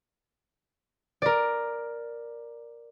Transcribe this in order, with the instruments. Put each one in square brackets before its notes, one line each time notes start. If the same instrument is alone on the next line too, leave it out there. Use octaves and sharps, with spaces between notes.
[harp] A#4 D5